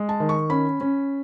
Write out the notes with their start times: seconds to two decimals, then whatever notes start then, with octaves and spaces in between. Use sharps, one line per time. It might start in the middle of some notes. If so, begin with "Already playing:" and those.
Already playing: G#3
0.09 A5
0.20 D#3
0.29 C#6
0.50 C#4 B5
0.81 C#4